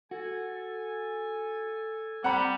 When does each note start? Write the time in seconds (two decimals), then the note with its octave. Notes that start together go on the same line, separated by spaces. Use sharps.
0.11 F#4 A4 G#5
2.24 G3 C4 F#5 A#5 B5